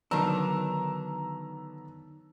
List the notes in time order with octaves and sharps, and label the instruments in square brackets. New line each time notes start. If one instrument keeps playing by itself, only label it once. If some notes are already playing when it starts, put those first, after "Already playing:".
[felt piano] D3 F#3 B3 [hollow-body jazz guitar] D#3 D4 [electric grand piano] A#5 E6